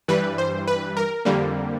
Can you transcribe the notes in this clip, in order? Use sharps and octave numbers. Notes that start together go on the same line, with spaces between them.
G2 E3 G3 B4
C5
B4
A#4
F2 D3 G3 A#3